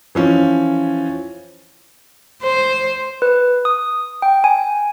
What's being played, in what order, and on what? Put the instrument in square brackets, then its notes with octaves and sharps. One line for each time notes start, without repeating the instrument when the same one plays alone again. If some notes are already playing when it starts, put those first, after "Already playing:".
[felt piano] E3 F3 C#4
[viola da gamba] C5
[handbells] B4
D#6
G5
G#5